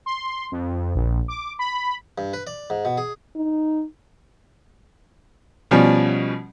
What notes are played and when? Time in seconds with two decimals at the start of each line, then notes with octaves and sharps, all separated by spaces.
0.06 C6
0.52 F2
0.95 A#1
1.28 D6
1.59 B5
2.18 G2
2.33 B4
2.47 D5
2.70 G#2
2.85 B2
2.98 G#4
3.35 D#4
5.71 B2 F3 G3 C#4